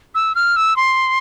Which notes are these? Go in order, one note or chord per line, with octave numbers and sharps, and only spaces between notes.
E6
F6
E6
C6